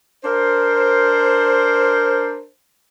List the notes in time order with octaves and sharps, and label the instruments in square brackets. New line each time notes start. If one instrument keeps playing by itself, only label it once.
[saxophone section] D4 A#4 C5